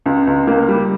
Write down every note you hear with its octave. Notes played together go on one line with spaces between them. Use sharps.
C#2
C#2
A#3
G3